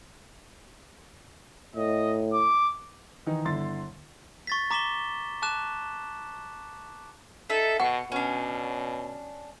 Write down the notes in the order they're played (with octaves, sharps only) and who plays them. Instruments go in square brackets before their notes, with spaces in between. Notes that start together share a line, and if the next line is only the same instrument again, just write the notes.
[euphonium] A2 [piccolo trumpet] D#5
[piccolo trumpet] D6
[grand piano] D#3 E3 D#4
G1 D3 E4 C6 A6
[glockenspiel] C#6 A6 B6
A#5 D6 B6 E7 G7
A5 D6 F#6 E7
[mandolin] D#4 E5 [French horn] A4
[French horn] B2 [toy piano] F#5 [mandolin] C#6
[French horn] B2 [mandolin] C#4 D4